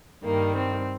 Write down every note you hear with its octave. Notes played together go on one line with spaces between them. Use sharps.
G2 D#3 G3 A#3
C4